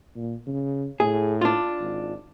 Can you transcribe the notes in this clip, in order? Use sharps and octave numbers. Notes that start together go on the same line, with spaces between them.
A#2
C#3
A2 G#4
D4 F4
G#1